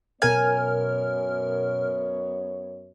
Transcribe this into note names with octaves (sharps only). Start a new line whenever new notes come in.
F#2 B2 B3 A#4 C#5 G#5 F6